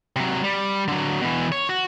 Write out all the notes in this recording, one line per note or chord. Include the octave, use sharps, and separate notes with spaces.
C3 F#3
G3
D3 F#3
B2 E3
C#5
F#4